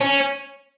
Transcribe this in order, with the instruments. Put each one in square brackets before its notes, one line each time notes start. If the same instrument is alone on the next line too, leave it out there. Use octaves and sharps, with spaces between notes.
[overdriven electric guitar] C#4